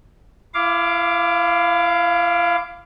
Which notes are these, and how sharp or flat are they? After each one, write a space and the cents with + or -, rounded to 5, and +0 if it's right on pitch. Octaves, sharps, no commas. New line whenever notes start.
E4 +35 F5 +0 D6 +0